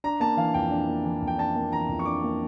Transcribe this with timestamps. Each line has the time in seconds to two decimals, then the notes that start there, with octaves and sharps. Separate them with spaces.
0.04 D4 A#5
0.20 A#3 A5
0.37 E3 F5
0.54 F2 G5
0.71 D4
0.89 A#3
1.04 E3
1.22 F2
1.27 G5
1.38 D4 A5
1.55 A#3
1.72 E3 A#5
1.89 F2
1.99 C#6
2.06 D4 D6
2.23 A#3